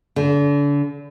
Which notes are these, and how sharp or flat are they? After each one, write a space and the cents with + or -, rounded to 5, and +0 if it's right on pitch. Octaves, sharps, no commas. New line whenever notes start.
D3 -35